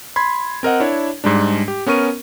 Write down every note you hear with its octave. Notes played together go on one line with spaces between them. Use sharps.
B5 C6 G#6
C4 A#4 D#5 F#5
D4 E4 C#5
G#2 G3 G#3 D4
G4
B3 C#4 A#4 C#6 D#7